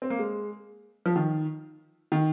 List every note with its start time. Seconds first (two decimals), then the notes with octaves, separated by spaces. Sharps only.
0.02 C4
0.10 A#3
0.19 G#3
1.06 F3
1.16 D#3
2.12 D#3